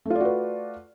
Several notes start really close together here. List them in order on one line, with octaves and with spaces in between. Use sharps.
A3 F4 D5 F#4 B4